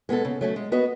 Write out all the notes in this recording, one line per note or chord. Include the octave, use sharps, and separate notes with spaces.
G#3 B3 E4 A4
C#3
F#3 A3 C#4
G#3
B3 F#4 B4 D#5